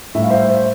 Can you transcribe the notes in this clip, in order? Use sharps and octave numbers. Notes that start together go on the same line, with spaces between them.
A2 G3 E5
F5
C5 E5
C5